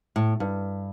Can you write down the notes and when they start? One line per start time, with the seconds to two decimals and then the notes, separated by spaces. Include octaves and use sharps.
0.16 A2
0.40 G2